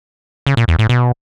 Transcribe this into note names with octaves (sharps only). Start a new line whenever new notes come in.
C#3
A#2
E2
A2
B2